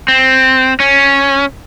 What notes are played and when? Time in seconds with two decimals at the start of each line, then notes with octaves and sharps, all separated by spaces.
0.08 C4
0.80 C#4